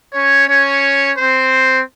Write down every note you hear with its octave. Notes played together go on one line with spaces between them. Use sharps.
C#4 C#5
C#4 C#5
C4 C5